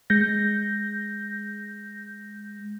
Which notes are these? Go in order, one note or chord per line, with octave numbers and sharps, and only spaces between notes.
G#3 G6 A#6